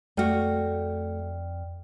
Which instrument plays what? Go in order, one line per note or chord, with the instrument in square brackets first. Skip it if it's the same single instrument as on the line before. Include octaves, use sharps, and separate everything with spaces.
[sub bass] F2 [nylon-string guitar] A3 F#4 [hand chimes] D5 G5 F6